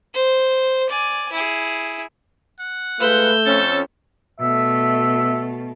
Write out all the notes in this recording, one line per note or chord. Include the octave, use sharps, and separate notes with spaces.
C5
D5 G#5
E4 G#4
F#5
G#3 A3 F4 B4 E6 G6
F2 C#4 A4
B2 A3 E5